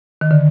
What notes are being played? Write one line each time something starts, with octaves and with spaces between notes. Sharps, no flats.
D#3
D3